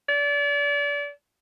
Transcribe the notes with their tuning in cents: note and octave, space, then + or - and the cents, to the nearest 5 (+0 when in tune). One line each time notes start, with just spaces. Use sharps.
D5 -35